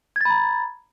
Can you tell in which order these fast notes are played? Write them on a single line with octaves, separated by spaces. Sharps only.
G#6 A6 B5 A#5